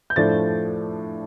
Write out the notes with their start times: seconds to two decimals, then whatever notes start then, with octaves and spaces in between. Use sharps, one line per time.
0.10 G6
0.16 A2 F3 A3 D4 A6